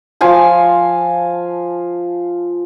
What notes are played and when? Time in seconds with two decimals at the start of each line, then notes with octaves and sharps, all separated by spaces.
0.21 F3 F5 G#5 A5